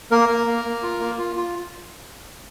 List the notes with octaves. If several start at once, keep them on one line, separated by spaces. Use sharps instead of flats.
A#3 A#4
A#3
A#3
A#3
F4
A#3
F4
F4